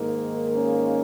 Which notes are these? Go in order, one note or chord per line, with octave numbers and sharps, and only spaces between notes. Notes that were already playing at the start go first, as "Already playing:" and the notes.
Already playing: G#2 D#3 A#3
C#4